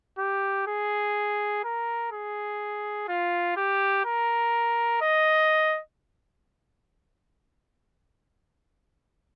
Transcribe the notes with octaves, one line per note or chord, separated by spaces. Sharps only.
G4
G#4
A#4
G#4
F4
G4
A#4
D#5